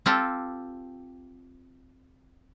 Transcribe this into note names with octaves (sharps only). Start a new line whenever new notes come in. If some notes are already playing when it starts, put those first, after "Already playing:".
C4 F4 G4 A4